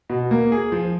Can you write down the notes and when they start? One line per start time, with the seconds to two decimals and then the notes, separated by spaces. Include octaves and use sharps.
0.10 B2
0.31 A#3
0.52 G#4
0.72 F3